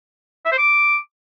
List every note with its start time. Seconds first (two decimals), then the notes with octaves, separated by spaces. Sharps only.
0.46 E5
0.52 C5
0.58 D6